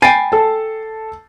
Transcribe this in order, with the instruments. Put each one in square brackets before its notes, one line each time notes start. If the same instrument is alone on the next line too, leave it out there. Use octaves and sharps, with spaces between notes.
[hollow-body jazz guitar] G5 G#5 [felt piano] B5 A6 C7
[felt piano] A4 A5